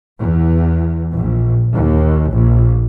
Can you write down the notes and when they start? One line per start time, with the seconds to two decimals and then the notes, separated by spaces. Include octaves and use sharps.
0.20 E2
1.14 A#1
1.74 D#2
2.30 A#1